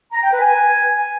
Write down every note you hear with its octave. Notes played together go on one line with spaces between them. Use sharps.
A#5
G5
B4
G#5